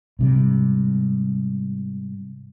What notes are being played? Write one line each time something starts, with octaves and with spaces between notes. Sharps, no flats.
G#2 C3 G3